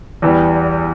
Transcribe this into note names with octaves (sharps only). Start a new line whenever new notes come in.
E2 E3 G3